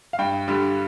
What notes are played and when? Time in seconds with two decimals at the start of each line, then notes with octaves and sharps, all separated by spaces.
0.13 F5
0.19 G2 G5
0.48 D3 G3